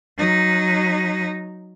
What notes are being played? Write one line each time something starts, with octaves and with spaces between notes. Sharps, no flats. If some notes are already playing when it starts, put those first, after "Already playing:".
F#3 D#4